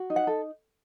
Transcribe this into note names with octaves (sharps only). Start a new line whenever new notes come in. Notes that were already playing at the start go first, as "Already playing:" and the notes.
Already playing: F#4
D#4
F#5
A4